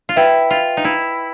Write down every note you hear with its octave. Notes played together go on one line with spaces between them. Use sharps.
F4
E4 B4 E5 G5
F4
D#4
E4